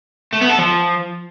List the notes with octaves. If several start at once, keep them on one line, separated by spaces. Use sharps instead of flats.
A3
B3
A4
F3